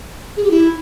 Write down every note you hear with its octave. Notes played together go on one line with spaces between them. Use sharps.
G#4
G4
E4